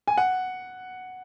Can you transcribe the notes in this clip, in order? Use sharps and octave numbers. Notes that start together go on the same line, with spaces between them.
G#5
F#5